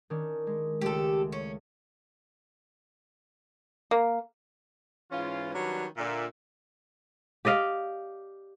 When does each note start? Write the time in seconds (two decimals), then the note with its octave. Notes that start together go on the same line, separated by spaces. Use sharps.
0.10 D#3 C#4 D4
0.47 G#3
0.81 C#2 G#3 A3 G4 A4
1.32 C#4
3.91 A#3
5.12 G#2 E3 C#4 F4
5.54 D#3 F#3 G3 C#4 D4 B4
5.97 A#2 D3 E5
7.45 G4 D5 D#5 F5